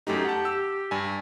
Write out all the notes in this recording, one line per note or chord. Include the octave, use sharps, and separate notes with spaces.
F#2 A3 D#4 G4
F#5 A5
E6
G2 D5 G#5